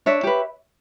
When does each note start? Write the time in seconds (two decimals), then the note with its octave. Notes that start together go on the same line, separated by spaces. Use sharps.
0.06 D4 C#5 E5
0.23 G4 B4